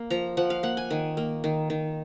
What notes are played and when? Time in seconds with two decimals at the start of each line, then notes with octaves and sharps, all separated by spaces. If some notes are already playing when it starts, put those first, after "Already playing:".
Already playing: A#3
0.10 F3 A#5
0.37 F3 F#5
0.50 F5
0.63 A#3 F#5
0.77 G#5
0.90 D#3
1.17 A#3
1.44 D#3
1.70 D#3